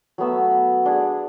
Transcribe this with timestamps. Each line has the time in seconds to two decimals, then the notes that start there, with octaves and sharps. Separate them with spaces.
0.18 F#3 A3 B3 E6
0.86 D4 G#4